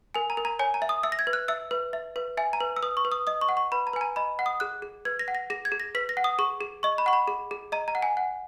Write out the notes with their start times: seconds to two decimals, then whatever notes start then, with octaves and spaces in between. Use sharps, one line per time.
0.15 A#4 G#5
0.30 A#5
0.37 A#4
0.45 A#5
0.59 C#5 G#5
0.74 A#5
0.82 E5
0.89 D#6
1.03 E5 E6
1.12 A#6
1.19 G#6
1.27 B4
1.33 F#6
1.48 E5 E6
1.71 B4
1.93 E5
2.16 B4
2.37 E5 G#5
2.53 A#5
2.60 B4
2.76 E6
2.83 B4 D#6
2.97 C#6
3.05 B4
3.12 D#6
3.27 D#5 D#6
3.41 C#6
3.49 F#5
3.57 C#6
3.72 B4 B5
3.87 A#5
3.93 B4 G#5
4.01 A#5
4.16 D#5 B5
4.39 F#5
4.46 D#6
4.60 G#4 F#6
4.82 G#4
5.05 B4 G#6
5.19 A#6
5.28 F#5
5.35 A#6
5.50 G#4 A#6
5.65 G#6
5.72 G#4
5.80 A#6
5.95 B4 B6
6.09 A#6
6.17 F#5
6.24 D#6
6.39 G#4 C#6
6.61 G#4
6.83 D#5 C#6
6.98 B5
7.06 F#5 C#6
7.13 B5
7.28 G#4
7.51 G#4
7.72 D#5 A#5
7.88 A#5
7.95 F#5
8.02 G#5
8.17 F#5